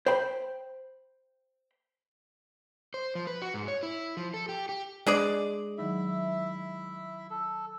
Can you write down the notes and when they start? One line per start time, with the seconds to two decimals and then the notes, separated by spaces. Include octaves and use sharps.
0.06 C5 G5 B5
2.94 C5
3.15 F3
3.27 B4
3.42 F#4
3.54 G#2
3.68 C#5
3.83 E4
4.17 F3
4.34 A4
4.49 G4
4.69 G4
5.06 G#3 D4 G#4 D5 D6
5.78 D#3 F#3 D#4 E4 E5
7.30 A4